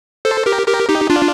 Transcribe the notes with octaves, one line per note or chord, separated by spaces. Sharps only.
A4 C5
G4 A#4
G4 A#4
D#4 G4
D4 F4